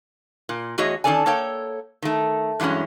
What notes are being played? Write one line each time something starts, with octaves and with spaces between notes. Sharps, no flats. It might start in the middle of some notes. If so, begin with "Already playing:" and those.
A#2
E2 A3 F#4 G#4 C#5 D#5
D#3 C#4 D4 A4 D5 G#5
A#3 A4 C#5 G5
D#3 A3
G2 E3 F#3 G#3 C#4